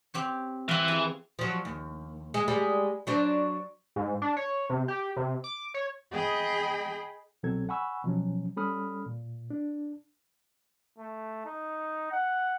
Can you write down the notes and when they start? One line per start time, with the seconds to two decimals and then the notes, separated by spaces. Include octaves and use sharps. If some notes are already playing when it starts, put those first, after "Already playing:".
0.14 C4 G4 C#5
0.68 E3 C4 F5
0.88 G#4
1.39 F3 F#3
1.65 D#2
2.34 G#3
2.48 G3 G#3
3.07 F#3 D4 C5
3.96 G#2
4.22 D4
4.37 C#5
4.70 C3
4.88 G4
5.16 C3
5.44 D6
5.74 C#5
6.12 G#4 D#5 G5 B5
7.43 C2 B2 F#3 C4 A4 G#6
7.69 F#5 G#5 B5 C#6 E6
8.04 B2 F3 F#3 C#4
8.57 G3 C#4 A4 B5 D#6 F6
9.06 A#2
9.50 D4
10.98 A3
11.45 D#4
12.11 F#5